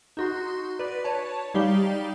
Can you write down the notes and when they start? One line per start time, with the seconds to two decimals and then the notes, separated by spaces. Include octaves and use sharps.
0.17 D#4 F#4 C6
0.79 B4 D5
1.04 C#5 A5
1.54 G3 D#4 G4 D5 F5 G7